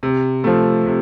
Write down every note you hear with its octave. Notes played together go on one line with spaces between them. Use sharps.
C3
F3 A3
C3